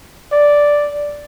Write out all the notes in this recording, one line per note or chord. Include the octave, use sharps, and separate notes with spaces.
D5